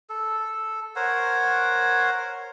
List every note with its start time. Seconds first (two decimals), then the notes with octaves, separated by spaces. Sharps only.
0.10 A4
0.96 A#4 C5 C#5 F#5